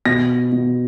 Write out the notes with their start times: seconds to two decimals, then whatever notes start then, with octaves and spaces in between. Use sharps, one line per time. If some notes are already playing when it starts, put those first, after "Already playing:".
0.05 B2 A#6
0.52 B2